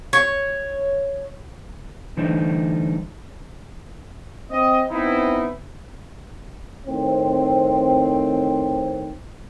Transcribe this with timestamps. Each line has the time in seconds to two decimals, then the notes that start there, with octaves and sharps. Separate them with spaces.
0.13 C#5
2.17 D3 E3 G3 A3 D#4 C5
4.51 C4 D#5
4.91 B3 C4 D#4 E4
6.87 A2 D#3 C4